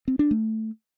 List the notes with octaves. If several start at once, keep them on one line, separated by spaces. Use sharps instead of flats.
C4
D4
A3